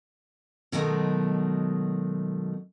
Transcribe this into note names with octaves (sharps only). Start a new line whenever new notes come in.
B2 D#3 F#3 G#3 A3